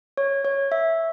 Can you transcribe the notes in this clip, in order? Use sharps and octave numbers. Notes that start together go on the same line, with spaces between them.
C#5
C#5
E5